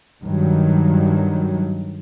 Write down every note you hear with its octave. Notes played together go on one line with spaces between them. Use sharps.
G2 D#3 F#3